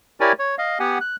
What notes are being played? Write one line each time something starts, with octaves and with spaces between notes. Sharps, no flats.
E4 G4 A#4 C#5 D5 G#5
C#5
D#5 F5
B3 G4 F#5 G#5
F#6